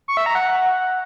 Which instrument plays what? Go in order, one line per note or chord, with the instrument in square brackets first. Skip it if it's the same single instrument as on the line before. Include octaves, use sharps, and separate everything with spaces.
[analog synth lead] C#6
E5
A#5
F#5